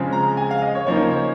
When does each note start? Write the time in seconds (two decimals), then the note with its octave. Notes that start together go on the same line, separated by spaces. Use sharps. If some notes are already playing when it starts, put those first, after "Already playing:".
Already playing: C#3 F3 G#3 C4
0.12 A#5
0.37 G#5
0.51 F5
0.62 D#5
0.75 C#5
0.87 C#3 F3 A#3 D#4 C#5
1.01 C5
1.11 C#5